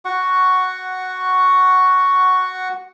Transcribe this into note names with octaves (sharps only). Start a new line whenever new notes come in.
F#4 F#5 C#6